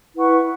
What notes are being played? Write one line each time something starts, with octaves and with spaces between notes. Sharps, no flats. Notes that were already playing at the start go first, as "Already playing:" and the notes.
E4 B4 F#5 C#6